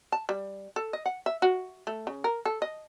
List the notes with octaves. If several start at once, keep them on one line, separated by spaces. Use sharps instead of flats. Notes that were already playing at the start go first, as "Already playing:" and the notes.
A5
G3
A4
D#5
F#5
E5
F#4
A3
C#3
A#4
A4
D#5